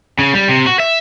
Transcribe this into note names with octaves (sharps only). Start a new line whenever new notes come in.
C#3
G3
C3
F#4
E5